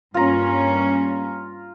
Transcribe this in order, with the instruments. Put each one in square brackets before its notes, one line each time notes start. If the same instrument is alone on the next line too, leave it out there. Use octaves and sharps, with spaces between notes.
[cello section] G2 A#3 C#4 [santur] F4 A#5